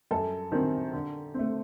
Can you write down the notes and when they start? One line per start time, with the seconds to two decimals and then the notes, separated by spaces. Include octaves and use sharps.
0.11 F#2 A4
0.52 D#3 F#3 C4
0.93 D3
1.34 A3 C4